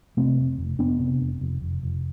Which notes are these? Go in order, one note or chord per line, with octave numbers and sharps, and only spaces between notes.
C3 A3 C4
F1
F1
F1 B3 D4
C3
F1
F1
F1
F1